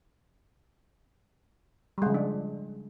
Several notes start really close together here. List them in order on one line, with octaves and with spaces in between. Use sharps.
G3 G#3 C#3 F3 D4